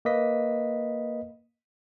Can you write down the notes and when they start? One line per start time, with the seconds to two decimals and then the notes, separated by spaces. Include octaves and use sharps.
0.05 A#3 B4 D#5 B6